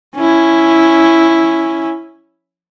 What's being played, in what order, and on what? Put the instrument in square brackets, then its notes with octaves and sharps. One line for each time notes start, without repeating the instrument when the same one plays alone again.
[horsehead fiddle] C#4 E4